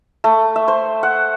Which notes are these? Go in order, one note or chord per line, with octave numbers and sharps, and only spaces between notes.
A3
E5
C5
F#5